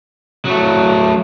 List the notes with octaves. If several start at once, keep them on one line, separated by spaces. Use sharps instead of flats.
F#3 A3